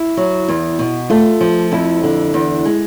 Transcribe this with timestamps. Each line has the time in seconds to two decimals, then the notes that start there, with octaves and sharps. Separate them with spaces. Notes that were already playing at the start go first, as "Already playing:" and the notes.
Already playing: E4
0.17 F#3
0.48 E2
0.79 B2
1.10 A3 F4
1.41 F3
1.72 F2 E4
2.03 D3
2.34 E2
2.65 G#3